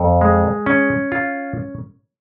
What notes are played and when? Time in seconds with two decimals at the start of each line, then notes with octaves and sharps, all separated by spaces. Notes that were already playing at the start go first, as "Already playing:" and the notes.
Already playing: F2
0.21 G#3
0.66 C#4
1.12 F4